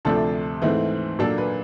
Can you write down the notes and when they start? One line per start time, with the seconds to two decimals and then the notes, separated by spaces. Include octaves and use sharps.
0.05 D2 C3 F3 A3 D4 A4
0.62 G#2 E3 A3 C4
1.19 A#2 F#3 A#3 D4 A4
1.38 B4